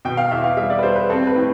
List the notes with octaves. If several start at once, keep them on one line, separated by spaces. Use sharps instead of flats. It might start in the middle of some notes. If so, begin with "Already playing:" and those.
B2 G5
F5
E2 E5
F5
G3 E5
D5
B4
G3 C5
B4
C4 A4
B4
A2